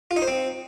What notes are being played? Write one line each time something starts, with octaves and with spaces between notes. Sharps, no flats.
F4
D#4
C5
C4